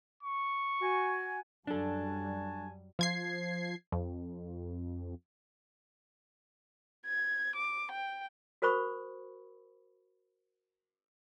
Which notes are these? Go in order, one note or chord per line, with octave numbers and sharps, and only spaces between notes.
C#6
F#4 G#5
F#2 F#3 G3 D4 F#4 A4 G#5 A5
F3 G#6 C7
F2
G#6
D6
G5
F#4 A#4 C5 B5 C#6 D#6